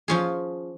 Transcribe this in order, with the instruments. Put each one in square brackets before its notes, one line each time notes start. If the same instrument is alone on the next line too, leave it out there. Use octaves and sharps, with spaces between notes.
[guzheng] F3 C#4 F4 G#4